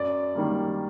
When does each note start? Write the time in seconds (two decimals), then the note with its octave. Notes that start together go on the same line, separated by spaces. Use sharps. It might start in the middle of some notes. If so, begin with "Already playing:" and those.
Already playing: F#2 D5
0.35 D#3 G3 A#3